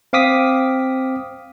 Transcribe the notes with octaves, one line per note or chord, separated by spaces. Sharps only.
C4 F5 D6 D#6 B6